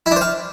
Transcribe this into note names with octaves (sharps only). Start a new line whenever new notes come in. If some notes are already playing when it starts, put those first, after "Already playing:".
E4
D4
C5
F5